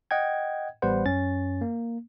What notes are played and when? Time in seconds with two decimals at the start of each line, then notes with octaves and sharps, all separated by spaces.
0.11 D#5 F#5 G5 G#6
0.82 A1 G3 B3 B4 C5 F#5
1.06 F#2 C#4 A6
1.61 A#3